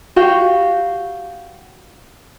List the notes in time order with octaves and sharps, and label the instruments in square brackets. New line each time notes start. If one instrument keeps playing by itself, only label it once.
[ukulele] F#4 G4 F5